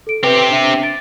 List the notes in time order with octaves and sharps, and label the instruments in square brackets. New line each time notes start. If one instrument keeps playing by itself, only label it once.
[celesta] A4 D7
[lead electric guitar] C4 G4 [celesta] B4
[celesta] D4 E5 D#7
A6 D7